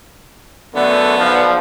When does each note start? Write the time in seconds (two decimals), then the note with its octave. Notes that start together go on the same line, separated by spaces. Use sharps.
0.75 F#2 D3 A3 B3 D5
1.18 B1 F3